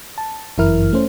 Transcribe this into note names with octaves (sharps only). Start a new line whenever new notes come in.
A5
G1 F#2 E3 E4 A#4 F6
A3 C#4 C5